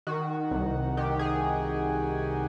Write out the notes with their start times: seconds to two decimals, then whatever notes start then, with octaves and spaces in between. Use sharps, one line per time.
0.07 D#3 F#4
0.51 C2
0.97 D#3 G4
1.19 G#4